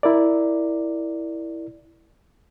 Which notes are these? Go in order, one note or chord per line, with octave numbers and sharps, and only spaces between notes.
E4 A#4 D5